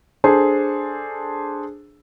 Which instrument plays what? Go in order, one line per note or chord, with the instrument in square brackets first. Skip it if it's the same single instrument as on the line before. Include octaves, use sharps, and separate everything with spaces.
[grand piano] D4 G#4 A4 C5